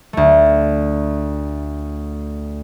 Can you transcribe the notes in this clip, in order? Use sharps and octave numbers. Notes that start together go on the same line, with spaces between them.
D2 A3